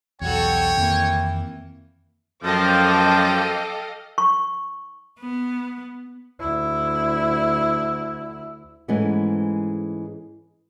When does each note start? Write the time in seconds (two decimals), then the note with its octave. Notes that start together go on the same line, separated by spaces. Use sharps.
0.21 B1 E2 G3 F#4 A4 C#5 G5
0.77 F2 D#3 E3 A#3 C4
2.44 F#2 F3 A4 D#5 F5 G5 A5 D6
4.18 C#6
5.20 B3
6.40 D2 E4
8.88 G#2 E3 G#3 A3 B3 C#4